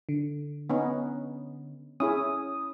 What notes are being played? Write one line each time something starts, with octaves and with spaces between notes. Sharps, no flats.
D3
B3 C#4 D#4
C#4 E4 G#4 D#6